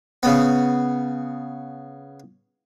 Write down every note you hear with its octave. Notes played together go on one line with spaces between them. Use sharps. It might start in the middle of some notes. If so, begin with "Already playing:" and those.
C#3 B3